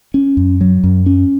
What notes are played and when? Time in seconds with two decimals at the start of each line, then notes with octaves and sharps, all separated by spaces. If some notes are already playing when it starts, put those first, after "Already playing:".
0.14 C#4
0.37 F#2
0.61 F#3
0.84 F#2
1.06 C#4